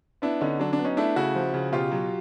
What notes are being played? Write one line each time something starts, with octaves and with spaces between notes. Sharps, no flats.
B3 D4 E4
D3 C#4 D#4
F#3 D4
D4
B3
C#4 D#4
A3 D4 E4
C#3 E4 F#4
F3
C#3
B2 F4 G4
F#3